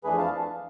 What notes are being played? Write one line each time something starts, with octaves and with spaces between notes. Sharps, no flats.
F2 E3 A3 D4 G#4 B4
F5 A5